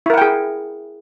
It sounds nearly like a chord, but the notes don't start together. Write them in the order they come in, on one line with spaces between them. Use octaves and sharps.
E4 A#4 F#5 G5 G#4